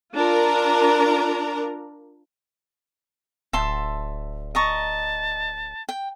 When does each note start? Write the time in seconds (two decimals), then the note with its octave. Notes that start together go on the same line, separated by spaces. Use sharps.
0.15 D4 F4 A#4 A#5
3.53 D1 E5 A5 C6
4.55 D#5 A5 A#5 C#6
5.89 G5